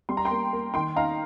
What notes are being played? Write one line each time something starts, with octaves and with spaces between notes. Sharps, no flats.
G3 C6
A#5
G5 C6
A#3
A#3
D#3 G5 C6
D#4 F5 A#5